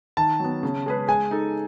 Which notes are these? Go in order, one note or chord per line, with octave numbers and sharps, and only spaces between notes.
D#3 A5
F#3 B3
C#3
G#3 C#4 G#4 B4
G#3 G#5
D#4 A4